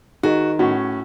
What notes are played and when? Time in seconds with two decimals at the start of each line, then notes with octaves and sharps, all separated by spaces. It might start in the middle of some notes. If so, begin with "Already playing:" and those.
0.23 D#3 D#4 F#4 G#4
0.59 A2 C#4 F#4